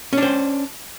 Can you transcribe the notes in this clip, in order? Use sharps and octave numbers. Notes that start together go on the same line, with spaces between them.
C#4 D4 C5